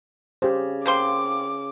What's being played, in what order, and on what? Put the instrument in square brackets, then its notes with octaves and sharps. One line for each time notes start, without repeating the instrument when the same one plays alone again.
[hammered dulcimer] C#3 [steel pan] G4 C5
[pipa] A#3 C4 C6 [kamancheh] D6